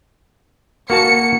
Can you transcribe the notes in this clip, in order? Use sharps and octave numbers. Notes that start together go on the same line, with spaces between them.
A#3 F#4 A5 C#7